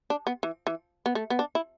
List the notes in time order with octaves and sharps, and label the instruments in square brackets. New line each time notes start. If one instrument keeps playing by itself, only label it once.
[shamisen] D4
B3
E3
E3
B3
A3
B3
D4
E4